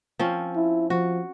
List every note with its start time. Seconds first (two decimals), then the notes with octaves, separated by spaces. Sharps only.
0.19 F3 C4 C#4
0.56 E4
0.90 F3 F#4